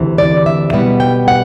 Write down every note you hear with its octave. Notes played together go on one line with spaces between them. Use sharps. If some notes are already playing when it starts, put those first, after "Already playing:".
Already playing: D2 C3 E3
D5
E5
B2 G3 B3 F#5
G5
F#5